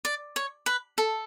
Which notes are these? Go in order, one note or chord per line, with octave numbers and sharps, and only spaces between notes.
D5
C#5
B4
A4